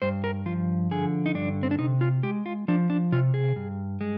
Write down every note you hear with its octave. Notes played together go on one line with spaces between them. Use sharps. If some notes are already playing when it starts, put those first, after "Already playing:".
G2 C5
A#4
F3 F4
D3 G#4
D#4
G2 D4
C4
D4
C3 D#4
F4
G#3 G4
F4
F3 D4
D4
C3 F4
G#4
G2
G#3